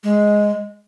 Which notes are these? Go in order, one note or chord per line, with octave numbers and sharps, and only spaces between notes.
G#3